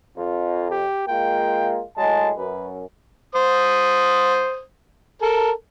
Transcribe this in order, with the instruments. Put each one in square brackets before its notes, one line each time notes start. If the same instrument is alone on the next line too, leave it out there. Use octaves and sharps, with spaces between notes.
[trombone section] F2 [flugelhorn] F4
[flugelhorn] G4
[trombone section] G#3 A#3 F4 [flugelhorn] G5
[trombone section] A2 F#3 G#3 [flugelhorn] A5
[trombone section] F#2 [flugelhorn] B4
[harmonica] C5 D#6
A4 A#4